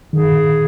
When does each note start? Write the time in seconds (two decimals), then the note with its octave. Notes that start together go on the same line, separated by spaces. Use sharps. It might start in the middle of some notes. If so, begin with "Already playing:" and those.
0.13 D#3 G#4